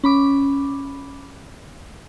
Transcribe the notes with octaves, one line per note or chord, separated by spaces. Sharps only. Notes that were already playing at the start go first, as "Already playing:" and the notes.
C#4 B5 D6